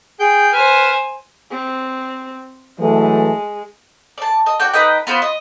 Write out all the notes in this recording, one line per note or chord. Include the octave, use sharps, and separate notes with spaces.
G#4 G5 G6
B4 C5 G#5 F6
C4
E3 F#3 G#3 A3
D5 A5
D#5
F#4 D5 G5
D#4 B4 D#5 G5
B3 F4 B4 C5
D#5